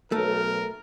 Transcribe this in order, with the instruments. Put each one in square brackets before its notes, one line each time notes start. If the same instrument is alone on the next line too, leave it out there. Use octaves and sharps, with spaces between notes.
[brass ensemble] B1 [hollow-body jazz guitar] A3 [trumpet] A#4